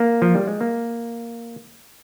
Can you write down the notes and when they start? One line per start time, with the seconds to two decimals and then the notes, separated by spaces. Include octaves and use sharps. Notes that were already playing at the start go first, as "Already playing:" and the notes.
Already playing: A#3
0.22 F3
0.35 G3
0.47 G#3
0.61 A#3